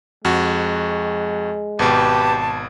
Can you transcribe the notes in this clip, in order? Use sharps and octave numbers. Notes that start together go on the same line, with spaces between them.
F2 G#3 F#4
G#1 B2 G4 B4 A5